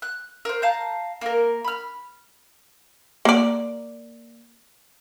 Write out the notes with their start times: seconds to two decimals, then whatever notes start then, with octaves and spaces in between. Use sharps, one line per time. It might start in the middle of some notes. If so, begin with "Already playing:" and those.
0.02 F#6
0.45 A#4 C5
0.62 F5 A5 A#5 G6
1.21 A#3 A#4
1.64 B5 F6
3.25 A#3 D5